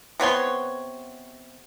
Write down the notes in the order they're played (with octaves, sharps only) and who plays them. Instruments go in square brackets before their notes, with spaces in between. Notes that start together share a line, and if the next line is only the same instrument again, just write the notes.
[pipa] C3 B3 C#5 C6